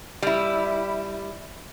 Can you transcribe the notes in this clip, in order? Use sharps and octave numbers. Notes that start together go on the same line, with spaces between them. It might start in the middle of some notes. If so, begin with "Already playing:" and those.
G3 E4